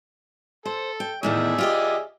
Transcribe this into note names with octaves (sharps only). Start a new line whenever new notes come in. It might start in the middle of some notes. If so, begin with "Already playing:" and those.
A4 C5
G5
E2 A2 D#3 G#4 D5 E5
F4 G4 D#5